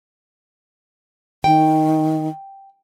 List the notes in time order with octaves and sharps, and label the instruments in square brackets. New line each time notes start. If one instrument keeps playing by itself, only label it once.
[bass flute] D#3 [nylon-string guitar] G5